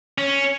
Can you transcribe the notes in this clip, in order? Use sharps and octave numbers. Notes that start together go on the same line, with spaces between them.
C#4